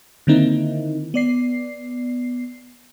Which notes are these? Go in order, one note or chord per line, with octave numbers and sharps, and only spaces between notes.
D3 D#3 A#3 C4 D#4 E4
B3 D5 C7